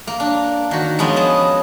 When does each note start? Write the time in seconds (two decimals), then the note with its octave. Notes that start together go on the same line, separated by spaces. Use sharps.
0.07 A#3
0.20 D4
0.71 D#3 F#4
0.99 F3 G#3 B3 C#4
1.16 G#4 A5